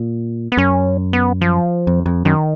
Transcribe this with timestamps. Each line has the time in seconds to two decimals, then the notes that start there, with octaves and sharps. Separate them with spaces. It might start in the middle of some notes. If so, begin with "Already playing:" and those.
Already playing: A#2
0.52 B3
0.57 F#2 C#4
1.13 B3
1.41 F3
1.87 F2
2.06 F2
2.25 F#2 D#3